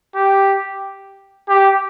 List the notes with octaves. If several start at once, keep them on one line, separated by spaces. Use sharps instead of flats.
G4
G4